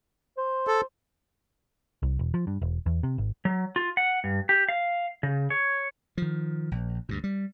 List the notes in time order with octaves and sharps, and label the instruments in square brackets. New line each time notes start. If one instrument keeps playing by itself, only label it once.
[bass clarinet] C5
[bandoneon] A4
[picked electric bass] C2
E1
F3
G2
E1
E2
C3
G#1
[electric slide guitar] F#3
F4
F#5
G2
G4
F5
C#3
C#5
[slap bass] D#3 F3
A#1
D2 G2 A#2
G3